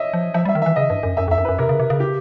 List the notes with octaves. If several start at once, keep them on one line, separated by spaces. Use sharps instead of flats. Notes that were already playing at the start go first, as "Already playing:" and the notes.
Already playing: C#5 D#5 E5
F3
F3 E5
G3 E5
D#3
E5
E3
C#3 D#5
G2
F#2
F#2 E5
F2 E5
F#2
B4
F#2
C3 A#4
C#3
C3
C#3
G4